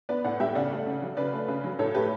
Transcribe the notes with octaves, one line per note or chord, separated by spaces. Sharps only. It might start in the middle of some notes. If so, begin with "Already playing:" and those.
B3 B4 D5
A2 D5 F#5
G3 E5 G5
C#3 D5 F#5
A3
C#3
F#3
C#3 B4 D5
A3
C#3
F#3
A2 A4 C#5
A3 G4 B4